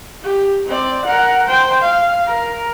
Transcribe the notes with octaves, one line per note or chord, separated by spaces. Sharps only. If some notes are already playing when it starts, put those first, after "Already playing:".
G4
C4 D5
A#4 F#5
C5 G5
F5
A#4